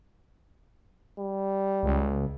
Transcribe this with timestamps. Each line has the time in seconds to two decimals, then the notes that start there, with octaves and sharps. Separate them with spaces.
1.19 G3
1.83 C#2